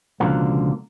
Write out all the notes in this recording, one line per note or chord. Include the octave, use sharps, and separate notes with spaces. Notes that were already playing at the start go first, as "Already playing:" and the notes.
C#2 B2 D3 F3 A#3